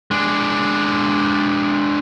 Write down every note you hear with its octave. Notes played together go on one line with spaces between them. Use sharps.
G#3 D4